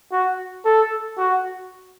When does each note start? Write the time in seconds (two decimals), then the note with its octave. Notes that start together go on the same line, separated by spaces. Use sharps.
0.12 F#4
0.65 A4
1.18 F#4